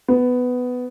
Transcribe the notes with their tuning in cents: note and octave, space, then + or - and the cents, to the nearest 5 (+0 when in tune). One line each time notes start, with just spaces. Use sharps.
B3 +10